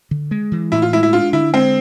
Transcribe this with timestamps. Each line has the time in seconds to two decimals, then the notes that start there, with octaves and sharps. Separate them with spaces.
0.11 D3
0.31 G#3
0.52 E3
0.72 A2 E4
0.82 F4
0.93 G#3 E4
1.03 E4
1.13 D4 F4
1.33 D3 E4
1.54 G#3 C4